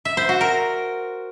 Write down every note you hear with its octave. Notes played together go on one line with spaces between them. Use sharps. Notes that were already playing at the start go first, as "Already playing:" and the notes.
E5
C5
F#4
A#4